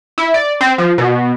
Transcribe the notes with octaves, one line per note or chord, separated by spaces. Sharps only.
E4
D5
C4
F3
B2